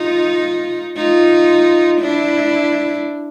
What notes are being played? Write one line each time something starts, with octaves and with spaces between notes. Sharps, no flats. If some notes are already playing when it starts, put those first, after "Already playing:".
Already playing: D#4 F4
D#4 F4
D4 E4